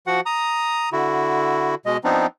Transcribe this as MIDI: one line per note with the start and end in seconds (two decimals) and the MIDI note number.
0.07 0.21 53
0.07 0.21 66
0.07 0.21 78
0.26 0.89 82
0.26 0.89 87
0.92 1.75 50
0.92 1.75 64
0.92 1.75 66
1.86 1.97 47
1.86 1.97 56
1.86 1.97 75
2.04 2.27 53
2.04 2.27 59
2.04 2.27 60
2.04 2.27 62
2.04 2.27 63